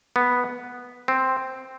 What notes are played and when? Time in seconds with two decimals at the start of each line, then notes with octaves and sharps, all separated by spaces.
0.16 B3
1.08 C4